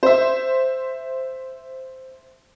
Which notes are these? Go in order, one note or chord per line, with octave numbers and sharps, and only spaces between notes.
C5 E5